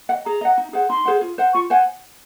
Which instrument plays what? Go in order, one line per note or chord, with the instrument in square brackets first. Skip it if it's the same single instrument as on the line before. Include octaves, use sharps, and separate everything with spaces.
[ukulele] F#5
D#5
[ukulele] G#4 [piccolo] A#5
[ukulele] D#5 F#5
D#4
G#4 C5 F#5
[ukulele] D#4 [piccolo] C6
[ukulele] G#4 C5 F#5
F4
C5 F#5
[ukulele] F4 [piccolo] C#6
[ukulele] C5 F#5 [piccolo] G#5